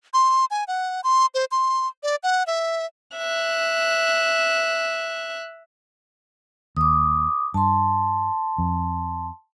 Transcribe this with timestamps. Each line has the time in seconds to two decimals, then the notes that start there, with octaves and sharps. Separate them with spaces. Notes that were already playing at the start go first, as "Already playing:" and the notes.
0.14 C6
0.51 G#5
0.68 F#5
1.04 C6
1.34 C5
1.51 C6
2.03 D5
2.23 F#5
2.47 E5
3.16 E5 F#6
6.77 D#2 D6 D#6
7.54 G2 A5 C6
8.58 F2